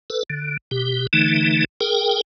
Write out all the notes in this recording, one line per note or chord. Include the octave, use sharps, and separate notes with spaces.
A4 B4
D3
B2 G4
D3 E3 A3 D#4
G#4 A#4 G5